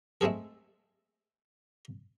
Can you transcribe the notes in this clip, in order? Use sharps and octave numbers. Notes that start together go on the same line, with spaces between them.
G#3 A3 C4 G#4 A4